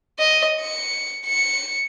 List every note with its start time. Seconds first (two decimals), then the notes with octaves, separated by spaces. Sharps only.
0.19 D#5
0.61 C#7
1.27 C#7